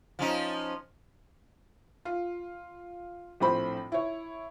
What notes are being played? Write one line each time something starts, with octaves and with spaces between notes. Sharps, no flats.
F3 C#4 D#4
F4
A#1 A2 C4 C5 B5
E4 C#5